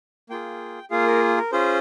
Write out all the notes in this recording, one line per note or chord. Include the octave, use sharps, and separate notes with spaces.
A#3 F4 G#4 G5
A#3 F4 G#4 F5
A#4
A#4
C#4 F4 G#4 C5